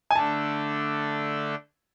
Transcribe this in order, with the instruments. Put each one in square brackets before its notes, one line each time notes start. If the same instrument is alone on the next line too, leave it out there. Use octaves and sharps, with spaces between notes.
[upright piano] G#5
[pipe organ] D3 A3 D4 A4 [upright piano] A5